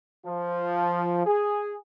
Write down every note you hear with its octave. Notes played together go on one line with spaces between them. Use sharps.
F3
G#4